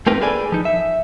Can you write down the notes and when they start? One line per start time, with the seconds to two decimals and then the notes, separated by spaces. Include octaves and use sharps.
0.07 A3 C4 D#4 G4 A#4 B4
0.21 G#4 A4 B4 D5 G#5
0.52 F3 D#4
0.65 E5